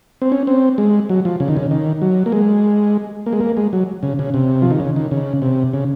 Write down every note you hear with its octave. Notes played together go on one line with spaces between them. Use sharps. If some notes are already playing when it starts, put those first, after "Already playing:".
C4
C#4
C4
G#3
F#3
F3
C#3
D#3
C#3
D#3
F#3
A#3
G#3
A#3
G#3
A#3
G#3
F#3
C#3
C#3
C3
F3
D#3
C#3
D#3
C#3
C3
C#3